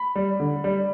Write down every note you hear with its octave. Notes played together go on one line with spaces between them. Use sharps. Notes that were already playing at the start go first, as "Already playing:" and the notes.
Already playing: B5
G3
D3
G3